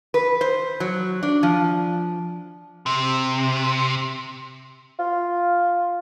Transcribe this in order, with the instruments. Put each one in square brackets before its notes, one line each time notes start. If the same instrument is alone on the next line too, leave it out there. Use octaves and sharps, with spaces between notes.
[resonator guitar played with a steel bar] B4
C5
F#3
D4
F3
[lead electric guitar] C3
[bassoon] F4